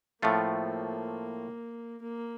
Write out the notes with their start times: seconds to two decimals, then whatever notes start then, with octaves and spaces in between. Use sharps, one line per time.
0.22 A2 F3 A3 A#3 C4 F4
2.02 A#3